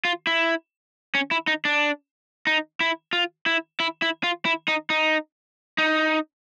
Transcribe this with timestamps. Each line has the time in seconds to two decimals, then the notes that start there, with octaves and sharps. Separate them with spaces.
0.05 F4
0.27 E4
1.15 C#4
1.31 E4
1.47 D#4
1.65 D4
2.47 D#4
2.80 E4
3.13 F4
3.46 E4
3.80 E4
4.02 E4
4.23 F4
4.45 E4
4.68 D#4
4.90 D#4
5.78 D#4